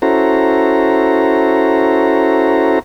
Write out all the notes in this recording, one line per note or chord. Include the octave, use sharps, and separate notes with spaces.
C#4 E4 F#4 A4 C5 A#5